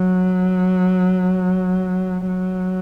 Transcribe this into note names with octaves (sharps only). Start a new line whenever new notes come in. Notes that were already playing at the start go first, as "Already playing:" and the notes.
Already playing: F#3
F#3